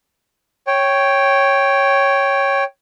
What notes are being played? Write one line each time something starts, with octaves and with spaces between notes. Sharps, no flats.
C#5 G5